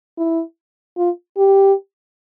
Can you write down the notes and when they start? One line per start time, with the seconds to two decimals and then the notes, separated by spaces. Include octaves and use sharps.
0.18 E4
0.98 F4
1.37 G4